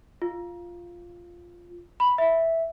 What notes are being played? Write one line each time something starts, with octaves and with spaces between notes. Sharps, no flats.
F4
B5
E5